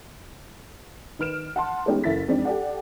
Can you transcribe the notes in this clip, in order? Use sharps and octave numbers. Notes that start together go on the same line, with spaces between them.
D#3 B4 F6 D7 E7
F#5 A5 C6
G#3 A3 B3 C#4 D#4 G4
F#1 E4 A4 A6 B6
F2 G#3 C4 D4 D#4
G4 A4 D5 F#5